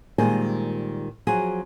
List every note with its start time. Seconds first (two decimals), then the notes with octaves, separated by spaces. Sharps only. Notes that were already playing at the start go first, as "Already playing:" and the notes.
0.18 A#2 D#3 G3 G#3 C4 G#4
1.27 F3 F#3 C4 F#4 G#4